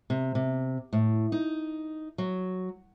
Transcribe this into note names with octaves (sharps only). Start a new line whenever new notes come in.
C3
C3
A2
D#4
F#3